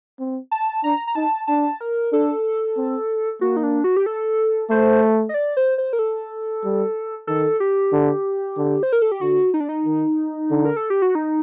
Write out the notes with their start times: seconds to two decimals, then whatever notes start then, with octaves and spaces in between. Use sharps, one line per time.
0.19 C4
0.51 A5
0.84 D4 A#5
1.07 A#5
1.15 D#4 A5
1.47 D4 A5
1.81 A#4
2.12 D4 A4
2.77 C4
3.41 A#3 F#4
3.56 D#4
3.63 D4
3.84 F#4
3.97 G4
4.06 A4
4.70 A3 C5
5.29 D#5
5.34 D5
5.57 C5
5.78 C5
5.93 A#4
5.99 A4
6.64 G3
7.27 D#3 A4
7.60 G4
7.92 D3
8.57 D3
8.83 C5
8.93 A#4
9.02 A4
9.12 G4
9.21 D3 F#4
9.54 D#4
9.60 D4
9.69 D#4
9.85 D#3
10.51 D3
10.65 A#4
10.76 A4
10.90 G4
11.02 F#4
11.15 D#4